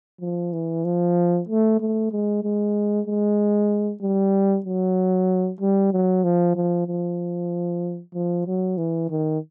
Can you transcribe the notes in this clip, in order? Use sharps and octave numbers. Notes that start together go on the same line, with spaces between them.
F3
E3
F3
A3
A3
G#3
G#3
G#3
G3
F#3
G3
F#3
F3
F3
F3
F3
F#3
E3
D#3